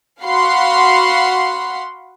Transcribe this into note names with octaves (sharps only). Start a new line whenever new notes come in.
F#4 F5 F#5 B5 C6 C7